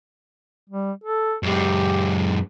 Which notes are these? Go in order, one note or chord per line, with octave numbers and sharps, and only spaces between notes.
G3
A4
F#2 G#3 G4